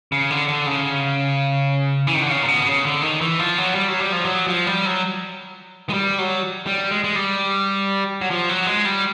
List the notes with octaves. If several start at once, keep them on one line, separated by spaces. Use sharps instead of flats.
C#3
D3
D3
C#3
E3
D#3
D3
C#3
A#2
B2
C#3
D3
D#3
E3
F3
F#3
G3
F#3
G3
F3
F#3
F3
G3
F#3
G#3
G3
F#3
G3
G#3
G#3
G3
F#3
F3
F#3
G#3
G3